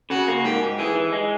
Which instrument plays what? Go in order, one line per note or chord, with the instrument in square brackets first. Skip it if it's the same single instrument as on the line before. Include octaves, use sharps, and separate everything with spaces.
[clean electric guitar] C#3 [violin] F#4
[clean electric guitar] A#3
[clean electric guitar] G#2 [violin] G4
[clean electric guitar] G#2
[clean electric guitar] E3 [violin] G#4
[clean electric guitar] E3
G#3